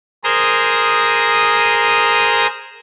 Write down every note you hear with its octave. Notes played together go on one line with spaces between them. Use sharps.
G#4 A#4 C5 A#5 C6 D#6